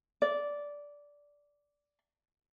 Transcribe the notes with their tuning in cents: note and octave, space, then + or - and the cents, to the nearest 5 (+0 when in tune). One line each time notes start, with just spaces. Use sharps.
D5 -10